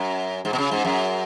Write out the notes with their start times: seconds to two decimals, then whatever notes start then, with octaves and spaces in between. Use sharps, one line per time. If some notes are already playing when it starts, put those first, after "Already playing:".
Already playing: F#2
0.45 G#2
0.53 B2
0.58 C#3
0.71 G#2
0.85 F#2